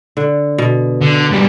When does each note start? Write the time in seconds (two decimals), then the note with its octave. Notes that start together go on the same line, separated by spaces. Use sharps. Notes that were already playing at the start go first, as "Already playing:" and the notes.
0.17 D3
0.58 B2
1.01 D3
1.31 G#2 G3